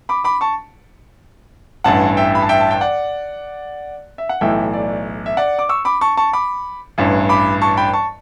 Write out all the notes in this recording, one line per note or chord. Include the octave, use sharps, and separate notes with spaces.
B5 D6
B5 D6
A5 C#6
A1 G2 E3 F#5 A5
E5 G5
B5
A5
E5 G5
A5
G5
D5 F#5
E5
F#5
B1 A2 E3 E5 G5
D5
E5
D5 F#5
D6
C#6 E6
B5 D6
A5 C#6
A5 C#6
B5 D6
A1 G2 E3
B5 D6
A5 C#6
G5 B5
A5 C#6